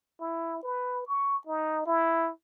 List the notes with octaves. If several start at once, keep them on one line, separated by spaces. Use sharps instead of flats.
E4
B4
C#6
D#4
E4